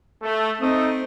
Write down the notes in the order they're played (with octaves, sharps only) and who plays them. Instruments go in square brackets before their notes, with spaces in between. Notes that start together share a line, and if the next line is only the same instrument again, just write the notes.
[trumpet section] A3
[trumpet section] A3 D#4 D#6 [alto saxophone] C4